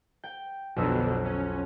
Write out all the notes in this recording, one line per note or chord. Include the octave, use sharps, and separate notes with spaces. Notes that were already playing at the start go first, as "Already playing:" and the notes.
G5
B1 F2 B2 D3 E6
C#4